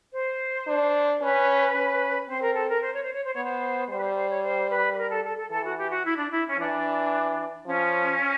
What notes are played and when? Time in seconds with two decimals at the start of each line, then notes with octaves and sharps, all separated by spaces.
0.13 C5
0.67 D4
1.21 C#4 B4
1.75 C#4
2.28 C4 C5
2.41 A#4
2.55 A4
2.69 A#4
2.82 C5
2.93 C#5
3.03 C5
3.13 C#5
3.24 C5
3.35 B3 C#5
3.45 C5
3.89 G3 C5
3.99 B4
4.03 C5
4.16 C5
4.30 C#5
4.43 C5
4.70 B4
4.93 B4
4.97 A#4
5.10 A4
5.24 A4
5.37 A4
5.50 E3 A4
5.65 F#4
5.78 G4
5.90 F#4
6.05 E4
6.17 D4
6.31 E4
6.49 C#4
6.59 E3 D4
7.66 F3 C#4